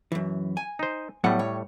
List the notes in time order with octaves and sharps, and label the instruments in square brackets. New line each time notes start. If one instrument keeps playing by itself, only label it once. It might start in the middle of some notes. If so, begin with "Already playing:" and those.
[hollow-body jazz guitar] F#2 E3
G#5
[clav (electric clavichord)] D#4 C5
[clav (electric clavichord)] A2 G3 [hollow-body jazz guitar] F#3 B3 F#5
[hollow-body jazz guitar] C#5